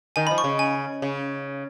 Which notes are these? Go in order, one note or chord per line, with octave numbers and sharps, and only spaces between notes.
D#3 G#5
B5
F3
C#6
C#3
G#5
C#3